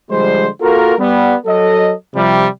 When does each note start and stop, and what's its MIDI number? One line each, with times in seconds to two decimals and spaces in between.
0.10 0.48 50
0.10 0.48 53
0.10 0.48 55
0.10 0.48 56
0.10 0.48 72
0.61 0.94 58
0.61 0.94 65
0.61 0.94 66
0.61 0.94 69
0.61 0.94 70
0.99 1.36 55
0.99 1.36 59
1.46 1.93 54
1.46 1.93 69
1.46 1.93 75
2.15 2.47 48
2.15 2.47 53
2.15 2.47 55